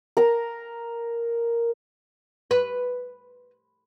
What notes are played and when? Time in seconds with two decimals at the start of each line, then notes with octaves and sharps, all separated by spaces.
0.17 A#4 A#5
2.51 B4